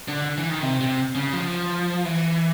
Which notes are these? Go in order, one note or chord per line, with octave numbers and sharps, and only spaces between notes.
D3
E3
D#3
C3
C3
C#3
F3
E3